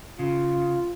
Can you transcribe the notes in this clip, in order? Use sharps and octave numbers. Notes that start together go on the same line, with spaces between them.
C#3 F4